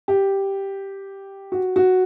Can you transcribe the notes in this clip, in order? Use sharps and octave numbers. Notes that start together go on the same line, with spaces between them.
G4
F#4
F#4